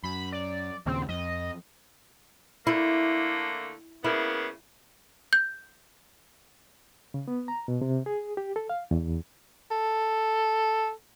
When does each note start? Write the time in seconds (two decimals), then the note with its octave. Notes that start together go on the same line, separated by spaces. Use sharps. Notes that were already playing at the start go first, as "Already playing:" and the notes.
0.03 F#2 B5
0.33 D5
0.86 D#2 A#2 C#3 C4
1.09 F2 D#5
2.67 D3 A3 A#3 E4
4.04 C#3 A#3 B3 E4
5.33 G6
7.14 C#3
7.28 B3
7.48 A#5
7.68 B2
7.82 C3
8.06 G#4
8.37 G4
8.56 A4
8.70 F5
8.91 E2
9.71 A4